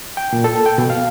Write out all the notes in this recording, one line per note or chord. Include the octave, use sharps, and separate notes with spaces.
G5
A#2
A4
G5
B2
F5